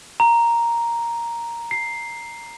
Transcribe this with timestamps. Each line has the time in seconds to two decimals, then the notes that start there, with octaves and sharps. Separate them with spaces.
0.20 A#5
1.71 C7